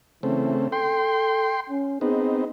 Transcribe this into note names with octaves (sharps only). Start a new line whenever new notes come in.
C#3 E3 A3 C4
A4 G5 C6
C#4
B3 C4 D#4 G#4